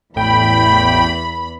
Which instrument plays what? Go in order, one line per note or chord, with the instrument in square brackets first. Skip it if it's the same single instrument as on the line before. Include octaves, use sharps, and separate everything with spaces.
[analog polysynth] A1 A2 G5 [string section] E2 B5